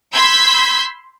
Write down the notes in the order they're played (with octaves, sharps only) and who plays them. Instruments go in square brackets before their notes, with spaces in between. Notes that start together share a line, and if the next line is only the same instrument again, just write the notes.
[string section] B5 C6 E6 G6 G#6 B6